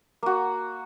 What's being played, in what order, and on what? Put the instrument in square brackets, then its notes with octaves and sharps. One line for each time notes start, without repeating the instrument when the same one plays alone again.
[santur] A#3 F#4